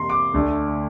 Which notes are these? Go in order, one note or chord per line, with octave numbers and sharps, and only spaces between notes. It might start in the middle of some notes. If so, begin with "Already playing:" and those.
Already playing: F2 C3 E3 A#3 A#5 C6
D6
D2 D3 A3